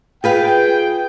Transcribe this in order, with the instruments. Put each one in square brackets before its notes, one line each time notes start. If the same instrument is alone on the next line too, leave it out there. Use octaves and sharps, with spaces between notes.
[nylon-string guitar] F4 B4 F5 [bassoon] G#4 [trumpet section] G5